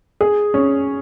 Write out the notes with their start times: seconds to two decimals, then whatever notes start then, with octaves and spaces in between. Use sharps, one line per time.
0.21 G#4
0.54 C#4